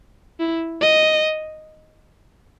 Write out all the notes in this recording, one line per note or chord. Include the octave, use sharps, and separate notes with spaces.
E4
D#5